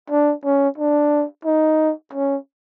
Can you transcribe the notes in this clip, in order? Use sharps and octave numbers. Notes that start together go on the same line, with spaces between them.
D4
C#4
D4
D#4
C#4